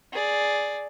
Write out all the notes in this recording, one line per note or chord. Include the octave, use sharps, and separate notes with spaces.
G#4 D5